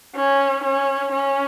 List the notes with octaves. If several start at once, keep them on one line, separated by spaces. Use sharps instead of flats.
C#4
C#4
C#4